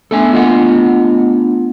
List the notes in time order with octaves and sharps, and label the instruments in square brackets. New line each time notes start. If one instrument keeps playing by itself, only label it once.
[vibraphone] A3 B3 D4 [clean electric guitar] A4 E5 G#5
[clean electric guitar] F4 D#5 F#5